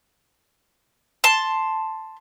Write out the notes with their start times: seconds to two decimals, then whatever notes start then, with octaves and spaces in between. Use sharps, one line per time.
1.24 A5 C6